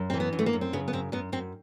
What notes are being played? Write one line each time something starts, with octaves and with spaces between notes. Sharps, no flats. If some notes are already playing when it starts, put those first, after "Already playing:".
Already playing: F#2
E3 C4
B3
F#2
A3
A#3
F#2
C4
C#3 B3
B3
F#2 C4
F#2 B3
F#2 C4